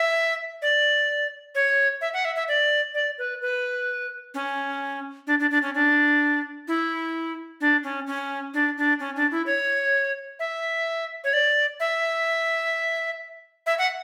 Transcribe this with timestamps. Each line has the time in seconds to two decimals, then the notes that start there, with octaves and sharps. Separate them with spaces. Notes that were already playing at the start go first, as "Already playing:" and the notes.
Already playing: E5
0.62 D5
1.55 C#5
2.01 E5
2.13 F#5
2.25 E5
2.36 E5
2.48 D5
2.94 D5
3.18 B4
3.42 B4
4.34 C#4
5.27 D4
5.40 D4
5.51 D4
5.62 C#4
5.75 D4
6.68 E4
7.61 D4
7.84 C#4
8.07 C#4
8.54 D4
8.78 D4
9.00 C#4
9.16 D4
9.31 E4
9.46 C#5
10.39 E5
11.24 C#5
11.33 D5
11.80 E5
13.66 E5
13.79 F#5